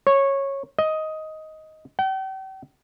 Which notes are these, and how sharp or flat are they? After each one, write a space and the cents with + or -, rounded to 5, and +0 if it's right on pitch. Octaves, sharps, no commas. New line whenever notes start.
C#5 -15
D#5 +10
G5 -40